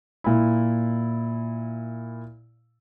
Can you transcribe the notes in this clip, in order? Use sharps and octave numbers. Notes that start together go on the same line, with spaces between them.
A#2 E4